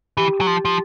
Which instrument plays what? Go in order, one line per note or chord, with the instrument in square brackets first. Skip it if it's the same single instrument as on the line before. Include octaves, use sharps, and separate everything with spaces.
[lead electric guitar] E3 [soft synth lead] G4
[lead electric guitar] F#3
F3
F3